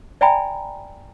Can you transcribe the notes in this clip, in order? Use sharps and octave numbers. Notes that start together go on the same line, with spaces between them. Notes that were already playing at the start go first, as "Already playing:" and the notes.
D5 E5 G5 G#5 A#5 B5